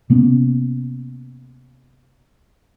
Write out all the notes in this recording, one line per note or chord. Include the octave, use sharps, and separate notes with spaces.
C3 A#3 B3 C#4